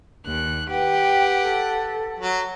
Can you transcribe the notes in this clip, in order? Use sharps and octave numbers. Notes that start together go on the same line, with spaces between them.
D#2 F#6
G4 B4 F#5 G5
A4
F#3